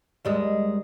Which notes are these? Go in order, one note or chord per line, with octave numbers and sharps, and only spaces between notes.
D#2 G3 G#3